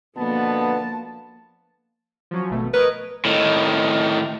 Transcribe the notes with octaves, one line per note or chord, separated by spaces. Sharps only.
B2 D3 F3 A#3 B3 A5
F3 F#3 C#4
G#1 B2 A3
A#4 B4 C#5 D#5
A2 D#3